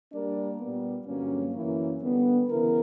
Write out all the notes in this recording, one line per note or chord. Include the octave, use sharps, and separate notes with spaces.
G3 A#3 D4 A#4 D5
A#2 G3 B3
G2 D3 F#3 A#3 C#4
F#2 E3 A#3 C#4 E4
D3 G3 B3
C#3 E3 B3 E4 A#4